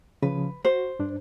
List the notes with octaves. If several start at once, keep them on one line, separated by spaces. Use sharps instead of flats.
C#3 F3 B4
F#4 C5
G2 D4